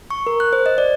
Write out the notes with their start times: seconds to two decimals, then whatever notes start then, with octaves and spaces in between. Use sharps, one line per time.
0.10 C#6
0.27 A#4
0.40 F#6
0.53 C5
0.66 D#5
0.78 D5